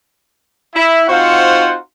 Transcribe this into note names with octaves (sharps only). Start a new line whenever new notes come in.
E4
C4 D#4 F4 F#4 C5 F#5